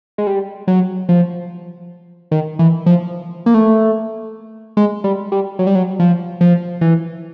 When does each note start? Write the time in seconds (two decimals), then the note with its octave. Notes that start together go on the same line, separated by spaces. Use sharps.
0.18 G#3
0.27 G3
0.67 F#3
1.09 F3
2.31 D#3
2.59 E3
2.86 F3
3.46 A#3
3.54 A3
4.77 G#3
5.04 G3
5.32 G3
5.59 F#3
5.67 G3
5.75 F#3
5.99 F3
6.41 F3
6.81 E3